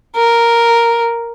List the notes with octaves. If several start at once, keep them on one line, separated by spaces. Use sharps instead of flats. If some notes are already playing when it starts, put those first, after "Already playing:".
A#4